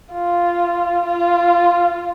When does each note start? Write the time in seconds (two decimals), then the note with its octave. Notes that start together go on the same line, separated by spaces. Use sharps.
0.14 F4
1.06 F4